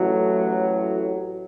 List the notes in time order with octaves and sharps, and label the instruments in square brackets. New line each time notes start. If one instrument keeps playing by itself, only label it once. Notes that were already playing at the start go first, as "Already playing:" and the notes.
Already playing: [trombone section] A1 A2 F#3